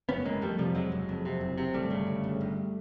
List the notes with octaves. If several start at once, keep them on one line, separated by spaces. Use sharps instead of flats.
F#1 B3 C#4
F#1 G#3 A#3
F2 G3 A3
C3 F3 G3
F2 F#3 G#3
F#1
F2
C3
F#1
C3
G1 G3 A3
C#3
G1
G1
G1